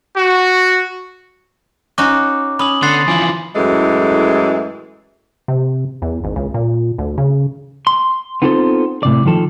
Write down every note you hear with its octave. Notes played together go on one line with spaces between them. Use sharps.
F#4
C#4 D#4 F#4 D6
C#4 B5 D#6 F#7
D3 B3 C6 A6 C7
E3 F3 G#5 F#7
F#2 A2 E3 G#3 A4
C3
E2
G#1
C#2
A#2
D2
C#3
C6
B3 C4 D#4 F4 A4 C5
A2 C3 D5
D#3 F3 A4